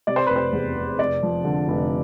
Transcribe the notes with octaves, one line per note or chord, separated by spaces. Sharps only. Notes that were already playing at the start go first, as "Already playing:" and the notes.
C3 D5
C5
F1 B4
C5
E2
F1
F1 D5
F3
D3
F1